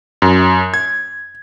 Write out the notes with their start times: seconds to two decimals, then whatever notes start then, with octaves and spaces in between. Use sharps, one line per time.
0.22 F#2
0.74 G#6